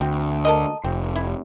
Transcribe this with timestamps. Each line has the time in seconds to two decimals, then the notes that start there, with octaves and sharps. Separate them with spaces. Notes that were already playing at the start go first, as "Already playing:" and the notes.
0.01 D2 C4
0.45 A4 A#4 D#5
0.84 F1 C4
1.15 E4